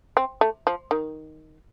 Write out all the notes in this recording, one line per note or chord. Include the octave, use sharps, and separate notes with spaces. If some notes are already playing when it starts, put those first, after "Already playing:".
C4
A3
F3
D#3